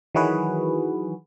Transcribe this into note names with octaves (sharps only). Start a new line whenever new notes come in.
D#3 E3 F#3 F#4 G#4 B4